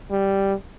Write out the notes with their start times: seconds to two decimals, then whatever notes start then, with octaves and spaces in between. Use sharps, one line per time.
0.11 G3